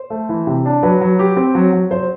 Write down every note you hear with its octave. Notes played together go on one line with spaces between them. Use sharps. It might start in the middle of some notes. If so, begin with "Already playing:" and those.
Already playing: C5
A3
E3
C3
D4
F#3 B4
F#3
G4
C4
F#3
F#3
C5